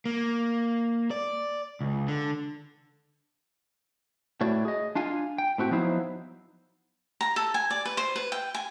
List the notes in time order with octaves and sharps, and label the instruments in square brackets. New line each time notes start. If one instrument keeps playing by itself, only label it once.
[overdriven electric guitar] A#3
D5
C#2
D3
[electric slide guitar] A2 A3 F#4 C#5 D5
G#4 D#5
D4 F4 F5 G#5
G5
A2 C4 F#4 G4
F3 F#3 B3 D#4 E4 C5
[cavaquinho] A#5
A4
G#5
D5
B4
C5
B4
G5
G#5